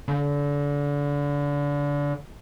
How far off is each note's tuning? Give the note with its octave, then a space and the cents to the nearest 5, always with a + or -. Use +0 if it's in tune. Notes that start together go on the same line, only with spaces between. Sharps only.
D3 -30